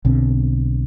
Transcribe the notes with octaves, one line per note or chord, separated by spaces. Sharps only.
B1 B2 D3 C4